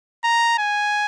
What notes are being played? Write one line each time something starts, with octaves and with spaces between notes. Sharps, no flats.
A#5
G#5